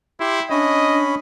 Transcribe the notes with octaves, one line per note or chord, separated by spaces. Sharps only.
E4 G4 C6
C#4 D4 C#5 D#5 B5